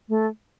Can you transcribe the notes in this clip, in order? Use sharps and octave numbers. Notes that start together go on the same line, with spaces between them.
A3